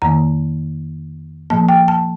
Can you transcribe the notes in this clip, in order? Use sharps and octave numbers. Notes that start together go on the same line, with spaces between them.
F2 D#3 A#3 A#5
A#2 F3 A#3 A5
G5
A5